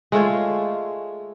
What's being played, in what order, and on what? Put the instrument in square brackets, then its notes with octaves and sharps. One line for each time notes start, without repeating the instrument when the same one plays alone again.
[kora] G#3 A3 F4 C#5